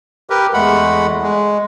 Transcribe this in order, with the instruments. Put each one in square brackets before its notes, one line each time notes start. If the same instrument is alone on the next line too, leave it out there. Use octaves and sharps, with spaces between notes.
[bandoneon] G4 A#4 B4
E2 G#3 A3 F#5 B5
G#3